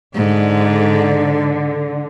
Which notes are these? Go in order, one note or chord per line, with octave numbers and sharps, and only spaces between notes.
G#2 D3